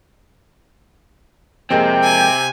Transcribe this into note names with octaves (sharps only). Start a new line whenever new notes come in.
F2 C3 G#3 A#3 C4 G5
G#5